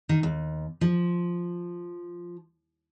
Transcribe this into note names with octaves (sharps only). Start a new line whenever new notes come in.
D#3
D#2
F3